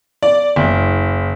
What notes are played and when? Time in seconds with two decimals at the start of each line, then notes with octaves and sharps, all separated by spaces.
0.23 D5
0.56 F#1